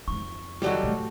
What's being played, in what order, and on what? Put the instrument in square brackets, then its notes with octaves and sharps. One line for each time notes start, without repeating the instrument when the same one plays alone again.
[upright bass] F2 D#4 [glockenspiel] C#6
[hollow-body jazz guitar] D#2 F#3 G3 [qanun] F#4 G4 A4
[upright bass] A2 A3